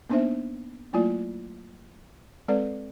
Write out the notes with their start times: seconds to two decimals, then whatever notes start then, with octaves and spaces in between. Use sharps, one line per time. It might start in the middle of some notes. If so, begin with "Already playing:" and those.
0.10 A#3 B3 D4 D#4 C5 E5
0.93 F#3 A3 A#3 E4 F4 D5
2.48 G#3 C4 A4 B4 D5